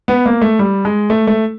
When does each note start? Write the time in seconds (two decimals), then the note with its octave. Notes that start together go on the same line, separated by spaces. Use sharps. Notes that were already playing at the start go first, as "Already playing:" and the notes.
0.08 B3
0.26 A#3
0.41 A3
0.59 G3
0.85 G#3
1.10 A3
1.27 A3